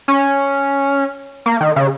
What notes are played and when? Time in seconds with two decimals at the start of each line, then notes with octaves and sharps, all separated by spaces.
0.08 C#4
1.46 A#3
1.61 D#3
1.76 C#3